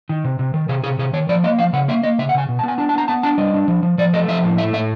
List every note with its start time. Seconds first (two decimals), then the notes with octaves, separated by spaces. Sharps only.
0.09 D#3
0.24 C3
0.39 C3
0.54 D#3
0.69 C3 G#4
0.84 C3 G#4
0.99 C3 G#4
1.13 D#3 C#5
1.29 F3 D5
1.44 A#3 D#5
1.59 F3 F5
1.73 C#3 F#5
1.88 A#3 E5
2.03 A#3 D#5
2.19 C#3 E5
2.29 F#5
2.34 C#3 G#5
2.49 B2
2.59 A5
2.63 B3 G#5
2.78 D4 A5
2.89 A5
2.94 B3 A#5
3.08 B3 A5
3.23 D4 A5
3.38 G3 D#5
3.54 D4
3.68 F3
3.83 F3
3.98 F3 D5
4.13 A3 D#5
4.28 F3 E5
4.44 A2
4.57 A3 E5
4.73 A2 E5